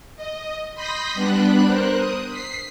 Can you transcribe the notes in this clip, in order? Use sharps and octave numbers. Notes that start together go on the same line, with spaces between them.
D#5
B5 C6 D#6 G6 A#6 B6
G3 B3 D4 B5 F#6
A#4 C5 F#6
D#6
B6 C7